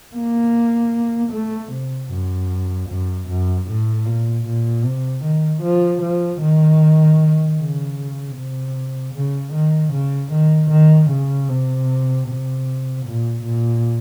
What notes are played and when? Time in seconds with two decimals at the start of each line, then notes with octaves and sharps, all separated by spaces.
0.16 A#3
1.33 A3
1.72 C3
2.11 F#2
2.89 F#2
3.29 F#2
3.68 A2
4.06 A#2
4.46 A#2
4.84 C3
5.24 D#3
5.63 F3
6.02 F3
6.41 D#3
7.59 C#3
8.36 C3
9.14 C#3
9.54 D#3
9.93 C#3
10.32 D#3
10.70 D#3
11.11 C#3
11.49 C3
12.27 C3
13.06 A#2
13.44 A#2